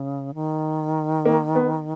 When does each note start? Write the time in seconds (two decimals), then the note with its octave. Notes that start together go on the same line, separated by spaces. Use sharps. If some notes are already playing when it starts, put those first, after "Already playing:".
Already playing: C#3
0.34 D#3
1.25 A#3
1.55 B3